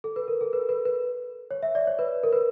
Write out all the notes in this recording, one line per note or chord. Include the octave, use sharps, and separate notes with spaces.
A4
B4
A#4
A4
B4
B4
B4
C#5
E5
D5
C#5
B4
A#4
B4